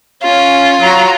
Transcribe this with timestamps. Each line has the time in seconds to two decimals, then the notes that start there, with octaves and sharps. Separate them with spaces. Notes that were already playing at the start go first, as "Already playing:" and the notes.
0.23 C#4 F4
0.80 F#3 A#5